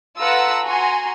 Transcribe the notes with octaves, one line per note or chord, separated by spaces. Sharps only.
F4 A4 B4 F#5 A#5 E6
F#4 G#5 A#5 C6